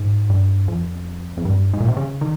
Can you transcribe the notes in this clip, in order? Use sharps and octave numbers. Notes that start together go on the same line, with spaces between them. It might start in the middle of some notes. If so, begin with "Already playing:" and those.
Already playing: G#2
G2
F2
F2
G2
G#2
A#2
C3
C#3
D#3